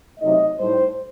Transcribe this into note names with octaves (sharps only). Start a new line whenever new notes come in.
C3 F#3 A3 D#4 D#5
A2 G3 D#4 C5